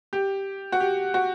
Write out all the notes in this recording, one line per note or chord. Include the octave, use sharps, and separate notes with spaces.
G4
F#4
G4
F#4